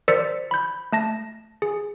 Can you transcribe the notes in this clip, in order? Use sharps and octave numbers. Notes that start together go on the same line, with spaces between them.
A#4 C5 D5 E6 B6 C#7
B5 G6
A3 A5 A#6
G#4